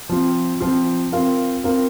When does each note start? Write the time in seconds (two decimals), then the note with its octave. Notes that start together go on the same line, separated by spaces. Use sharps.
0.09 F3 C4 F4
0.60 F3 C4 F4
1.12 C4 F4 A#4 F5
1.64 C4 F4 A#4 F5